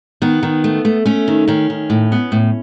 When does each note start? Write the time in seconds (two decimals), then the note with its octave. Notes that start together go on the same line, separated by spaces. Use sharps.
0.22 D#3 B3
0.43 D#3
0.64 A3
0.85 A3
1.05 A3 C#4
1.28 D#3
1.47 D#3 C#4
1.70 D#3
1.90 A2
2.12 B3
2.32 A2